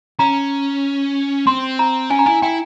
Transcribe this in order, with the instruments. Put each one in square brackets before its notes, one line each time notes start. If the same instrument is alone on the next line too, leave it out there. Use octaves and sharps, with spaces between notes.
[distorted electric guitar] C#4 [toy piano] A#5
[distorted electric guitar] C4 [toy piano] C6
[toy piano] A#5
[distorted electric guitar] C#4 [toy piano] G#5
[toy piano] A#5
[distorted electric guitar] E4 [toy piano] G#5
[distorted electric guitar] E4 [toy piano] G5